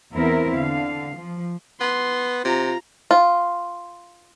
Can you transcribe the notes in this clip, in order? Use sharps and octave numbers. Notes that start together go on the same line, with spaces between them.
E2 B3 C4 E4 A#4
D3 F5
F3
B3 C6
C3 F4 A#5
F4